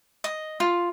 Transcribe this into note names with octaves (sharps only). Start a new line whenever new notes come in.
D#5
F4